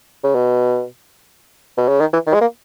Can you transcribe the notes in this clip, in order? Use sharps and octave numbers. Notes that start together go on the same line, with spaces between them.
C#3
B2
B2
C#3
D#3
E3
D#3
G#3
A#3